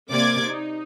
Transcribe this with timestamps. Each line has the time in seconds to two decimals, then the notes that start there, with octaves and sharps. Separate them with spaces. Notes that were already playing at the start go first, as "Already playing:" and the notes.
0.10 C3 A#3 D5 D6 G#6
0.48 D#4